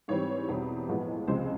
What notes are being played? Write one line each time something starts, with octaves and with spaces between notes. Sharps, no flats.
G#2 E3 G3 C4 C#5
E2 B2 G3 C4
A2 F3 G#3 B3
C#2 C3 F3 G#3 C5